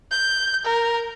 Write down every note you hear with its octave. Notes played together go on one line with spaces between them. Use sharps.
G6
A#4